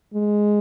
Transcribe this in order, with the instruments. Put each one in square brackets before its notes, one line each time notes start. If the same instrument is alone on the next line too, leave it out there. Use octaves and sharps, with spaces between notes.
[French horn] G#3